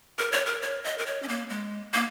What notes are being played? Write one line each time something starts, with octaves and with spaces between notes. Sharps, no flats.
A#4
C#5
A#4
C#5
D#5
A#4
C#5
C#4
A#3
G#3
A#3